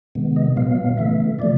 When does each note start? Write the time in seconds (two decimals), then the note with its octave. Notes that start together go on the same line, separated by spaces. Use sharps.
0.15 C3 D#3 G#3 B3
0.36 D#5
0.57 A#2 F#3 B3 F5
0.71 F5
0.84 F5
0.97 C#3 E3 A3 E5
1.39 C3 F3 A3 D5